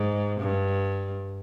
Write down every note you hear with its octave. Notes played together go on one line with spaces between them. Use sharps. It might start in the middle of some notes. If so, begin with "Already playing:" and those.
Already playing: G#2
G2